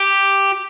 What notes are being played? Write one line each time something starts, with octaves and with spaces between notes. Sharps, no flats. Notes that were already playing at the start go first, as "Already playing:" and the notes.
Already playing: G4